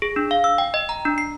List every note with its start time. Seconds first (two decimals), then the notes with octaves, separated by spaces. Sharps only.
0.02 G#4
0.16 D4
0.31 F5
0.44 E6
0.58 G5
0.74 D#5
0.89 A#5
1.05 D4
1.18 C7